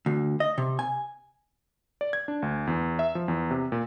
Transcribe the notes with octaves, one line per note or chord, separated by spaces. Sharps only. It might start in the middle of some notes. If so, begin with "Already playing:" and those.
D2
D#5
C3
G#5
D5
G#6
D4
D2
E2
E5
F3
E2
C3
A#2